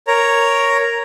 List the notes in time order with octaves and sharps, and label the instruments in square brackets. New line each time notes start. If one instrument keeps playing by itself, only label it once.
[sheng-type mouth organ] A#4 C#5 A#5